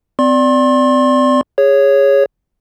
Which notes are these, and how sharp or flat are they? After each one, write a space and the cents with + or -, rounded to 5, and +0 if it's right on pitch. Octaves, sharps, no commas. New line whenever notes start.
C4 -35 D5 -5 C6 +35
G#4 -15 C#5 +0